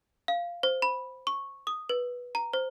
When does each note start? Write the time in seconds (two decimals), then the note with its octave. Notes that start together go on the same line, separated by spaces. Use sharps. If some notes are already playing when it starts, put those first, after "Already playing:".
0.28 F5
0.63 C5
0.82 B5
1.27 C#6
1.67 D#6
1.89 B4
2.35 A#5
2.54 C5